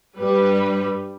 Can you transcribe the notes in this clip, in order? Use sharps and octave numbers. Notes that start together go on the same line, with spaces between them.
G2 G3 B4